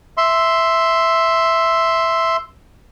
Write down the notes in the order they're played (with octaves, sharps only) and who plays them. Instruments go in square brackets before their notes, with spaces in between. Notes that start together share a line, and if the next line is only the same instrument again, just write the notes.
[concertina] E5 C6